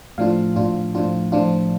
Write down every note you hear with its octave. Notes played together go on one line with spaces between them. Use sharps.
A2 F3 D4 F4 F5
A2 F3 D4 F4
A2 F3 D4 F4
A2 F3 D4 F4